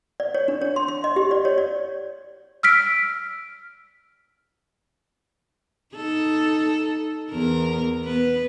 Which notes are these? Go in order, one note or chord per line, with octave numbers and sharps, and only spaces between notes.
D5
C#5
D4
C#5
C6
C6
D#5
G4
D5
C#5
D5
E6 F6 B6 D7
D#4 A4
E2 A#4
B3 B4